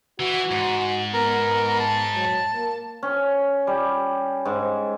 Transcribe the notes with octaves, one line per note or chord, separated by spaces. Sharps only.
E3 F#4
G#2
B3 A#4
A5
F#3
A#3
C#4
G3
G#2